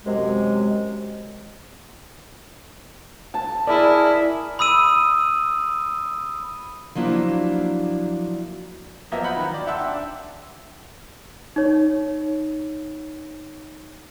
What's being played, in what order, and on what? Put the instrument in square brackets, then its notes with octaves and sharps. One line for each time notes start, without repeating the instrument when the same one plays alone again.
[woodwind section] F#2 C3 G#3
[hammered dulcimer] A5
[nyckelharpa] E4 [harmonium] G#4 A#4 [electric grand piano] D5
[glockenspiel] B5 D#6 E6 D#7
[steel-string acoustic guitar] F3 F#3 A#3 D4 E4
[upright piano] F3 F#3 A#3 B3 D#5 E5
F#5 B5 G6 F#7
D#3 F#3
D5
E5 F#5 G5 A5 C6 E6
D4
[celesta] D#4 C#5